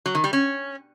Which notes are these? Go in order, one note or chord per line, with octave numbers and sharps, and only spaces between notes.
F#3
D#3
G3
C#4